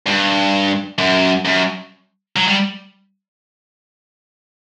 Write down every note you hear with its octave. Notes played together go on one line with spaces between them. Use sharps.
G2
F#2
F#2
F#3
G3